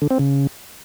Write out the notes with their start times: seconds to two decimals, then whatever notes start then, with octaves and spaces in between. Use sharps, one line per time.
0.02 D3
0.11 C4
0.19 C#3